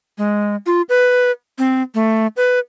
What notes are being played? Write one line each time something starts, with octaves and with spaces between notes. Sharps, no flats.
G#3
F4
B4
C4
A3
B4